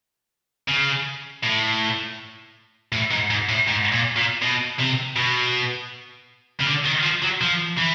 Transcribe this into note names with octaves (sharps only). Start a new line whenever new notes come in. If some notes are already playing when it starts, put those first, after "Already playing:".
C#3
A2
A2
G#2
G#2
A2
G#2
A#2
A#2
B2
C3
B2
C#3
D3
D#3
F3
F#3
F3
E3